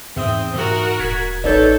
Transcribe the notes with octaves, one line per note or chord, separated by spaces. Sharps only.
E2 G#2 C4 E5 D#6
G#2 F#4 A#4
D#1 G#6 B6
A1 D#4 A4 B4 C#5 D5 G6